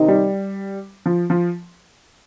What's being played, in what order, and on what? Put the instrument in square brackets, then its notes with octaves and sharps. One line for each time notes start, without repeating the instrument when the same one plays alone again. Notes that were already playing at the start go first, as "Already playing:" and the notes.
Already playing: [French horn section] C3 D#3 C4 D#4
[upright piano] G3
F3
F3